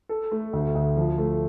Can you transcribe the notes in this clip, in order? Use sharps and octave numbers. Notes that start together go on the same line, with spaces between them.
A4
A3
D2
D2
F3
A3